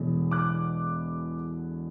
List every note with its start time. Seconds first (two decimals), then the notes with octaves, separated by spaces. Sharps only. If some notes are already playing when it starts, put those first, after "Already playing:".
Already playing: E1 E2 B2 A3
0.31 D6 F#6